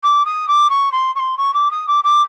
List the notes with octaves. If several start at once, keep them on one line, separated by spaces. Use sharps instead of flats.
D6
D#6
D6
C#6
C6
C#6
C6
C#6
D6
D#6
D6
D6